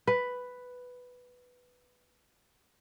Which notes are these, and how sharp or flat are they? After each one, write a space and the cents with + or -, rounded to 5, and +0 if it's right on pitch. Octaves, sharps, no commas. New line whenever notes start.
B4 +5